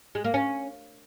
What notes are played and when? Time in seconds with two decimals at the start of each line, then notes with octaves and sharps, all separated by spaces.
0.15 G#3
0.24 A#3
0.34 C#4